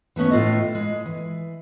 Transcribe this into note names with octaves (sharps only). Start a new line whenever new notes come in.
E3 A3 B3 C#4
A2 F4 A4 D#5
G#3
E3